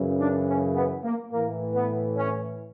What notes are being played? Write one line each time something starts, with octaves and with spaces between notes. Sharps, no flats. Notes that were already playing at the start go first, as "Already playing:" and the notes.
Already playing: F#2 C#3 E3
D4
C#4
B3
A#3
A2 E3 A#3
B3
C#4